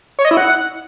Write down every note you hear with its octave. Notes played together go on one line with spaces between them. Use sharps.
C#5
D#5
E4
F#5